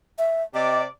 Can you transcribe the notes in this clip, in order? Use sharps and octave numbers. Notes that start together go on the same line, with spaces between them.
E5
C3 D5 D#5